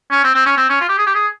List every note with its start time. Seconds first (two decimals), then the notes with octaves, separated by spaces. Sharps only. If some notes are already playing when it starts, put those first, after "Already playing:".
0.11 C#4
0.24 C4
0.34 C4
0.46 C#4
0.57 C4
0.69 C#4
0.81 F4
0.89 G4
0.98 G#4
1.06 G4
1.15 G#4